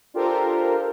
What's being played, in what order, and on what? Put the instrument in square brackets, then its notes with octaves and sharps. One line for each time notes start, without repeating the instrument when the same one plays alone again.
[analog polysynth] D4 F4 G4 A4 A#4 C5